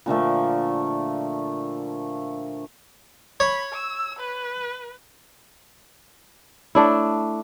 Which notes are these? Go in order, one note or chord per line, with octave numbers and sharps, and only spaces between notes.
A#2 D3 F3 A3
C#5 B5
E6
B4
A3 D4 E4